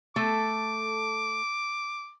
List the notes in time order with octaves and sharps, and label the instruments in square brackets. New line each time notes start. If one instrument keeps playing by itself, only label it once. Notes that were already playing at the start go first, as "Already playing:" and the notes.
[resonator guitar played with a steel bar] A3 A4 [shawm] D6